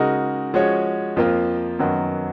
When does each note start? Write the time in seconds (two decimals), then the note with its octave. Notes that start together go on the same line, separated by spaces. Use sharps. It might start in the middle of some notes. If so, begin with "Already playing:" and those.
Already playing: C#3 G#3 D#4 F#4 A#4
0.54 F3 G#3 C#4 F#4 C#5
1.16 F2 F3 A#3 F4 A#4
1.79 F#2 D#3 F#3 B3